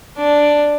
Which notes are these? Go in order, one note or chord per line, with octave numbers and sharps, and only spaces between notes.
D4